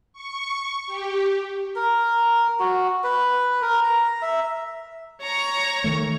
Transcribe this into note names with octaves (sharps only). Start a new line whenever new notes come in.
C#6
G4
A#4
F#4
B4
A#4
A#5
E5
C#5 A#5 C#6
D#3 A3